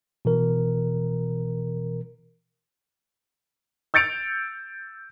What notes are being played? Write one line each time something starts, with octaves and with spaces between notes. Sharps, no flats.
B2 E3 A#4
E6 G6 A6 C#7 D7 F7